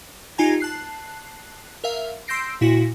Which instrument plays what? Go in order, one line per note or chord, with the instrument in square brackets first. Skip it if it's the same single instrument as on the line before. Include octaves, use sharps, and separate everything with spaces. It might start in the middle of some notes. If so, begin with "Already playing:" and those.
[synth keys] D#4 F4 G4 G#5 A#5 G#6
A5 F#6 C7
A#4 E5 F5
C6 E6 G6 A#6 C7 D7
A#2 E4 F#4 A#6